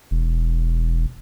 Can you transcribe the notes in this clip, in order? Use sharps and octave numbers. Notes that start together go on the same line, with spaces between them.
E1